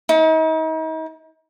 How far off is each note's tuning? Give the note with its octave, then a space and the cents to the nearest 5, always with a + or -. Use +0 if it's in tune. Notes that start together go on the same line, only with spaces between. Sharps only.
D#4 +40